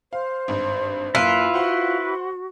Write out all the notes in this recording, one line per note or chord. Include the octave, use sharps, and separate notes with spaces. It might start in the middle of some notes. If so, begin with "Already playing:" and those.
C5 F5
G#1 G2
F#2 A#3 E4 F4 B4
F#4 C5 F#5 C6